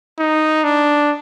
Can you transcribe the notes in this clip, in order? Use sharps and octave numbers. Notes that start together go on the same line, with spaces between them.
D#4
D4